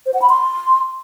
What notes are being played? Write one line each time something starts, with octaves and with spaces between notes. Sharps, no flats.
C5
F#5
B5
C6